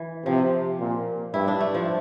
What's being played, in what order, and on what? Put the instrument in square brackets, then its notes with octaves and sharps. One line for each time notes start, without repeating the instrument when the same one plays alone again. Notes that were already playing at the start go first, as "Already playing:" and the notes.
Already playing: [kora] E3
[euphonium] C3 [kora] F3
[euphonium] A#2
[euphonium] G2 [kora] E4
[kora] D4
A3
F3